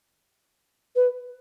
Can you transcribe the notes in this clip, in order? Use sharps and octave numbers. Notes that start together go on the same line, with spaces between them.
B4